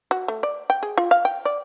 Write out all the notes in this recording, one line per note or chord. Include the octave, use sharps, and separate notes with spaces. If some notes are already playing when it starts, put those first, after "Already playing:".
F#4
A3
D5
G5
G#4
F4
F5
G5
D5